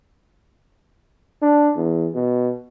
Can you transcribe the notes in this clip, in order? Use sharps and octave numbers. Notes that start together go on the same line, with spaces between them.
D4
E2
B2